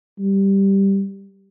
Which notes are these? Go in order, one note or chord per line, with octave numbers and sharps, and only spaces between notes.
G3